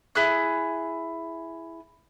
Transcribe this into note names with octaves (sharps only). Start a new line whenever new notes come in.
E4 G#4 F#6